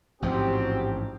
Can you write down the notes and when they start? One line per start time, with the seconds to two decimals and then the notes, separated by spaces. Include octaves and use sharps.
0.22 A1 G#2 F3 C4 F#4 G4